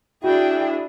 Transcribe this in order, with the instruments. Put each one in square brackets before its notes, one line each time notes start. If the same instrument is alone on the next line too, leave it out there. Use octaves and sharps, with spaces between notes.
[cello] D4 G#4 [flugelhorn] E4 [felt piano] F#4 [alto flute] G5